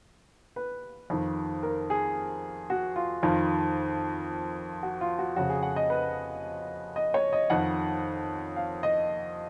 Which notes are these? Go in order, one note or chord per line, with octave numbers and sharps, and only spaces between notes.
B4
F2 D#3
A#4
G#4
F#4
F4
F2 D#3 F4
F#4
F4
F#4
F2 C#3 F#4
G#4
F#5
D#5
B4
D#5
C#5
D#5
F2 D#3 F#5
F5
D#5